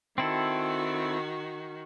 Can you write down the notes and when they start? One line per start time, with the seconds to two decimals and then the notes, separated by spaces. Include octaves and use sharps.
0.18 D#3 C4 E4 F#4 A4